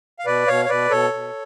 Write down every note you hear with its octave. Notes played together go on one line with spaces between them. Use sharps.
F5
B2 B4 D5
B2 C#5 F5
C#5
B2 B4 D5
B2 A4 C#5
B2